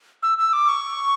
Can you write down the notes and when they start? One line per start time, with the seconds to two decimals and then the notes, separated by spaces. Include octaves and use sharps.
0.23 E6
0.38 E6
0.53 D6
0.69 C#6